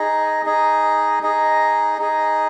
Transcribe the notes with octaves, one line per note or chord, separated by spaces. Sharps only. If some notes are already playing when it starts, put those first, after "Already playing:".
Already playing: D#4 G#4 D#5
D#4 G#4 D#5
D#4 G#4 D#5
D#4 G#4 D#5